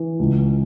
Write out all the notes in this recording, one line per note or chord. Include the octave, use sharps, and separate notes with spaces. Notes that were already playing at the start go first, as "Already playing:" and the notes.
Already playing: E3
C#2